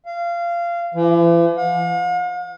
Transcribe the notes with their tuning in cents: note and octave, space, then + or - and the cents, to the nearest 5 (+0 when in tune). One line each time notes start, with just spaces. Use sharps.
F5 -20
E3 +45
F5 +45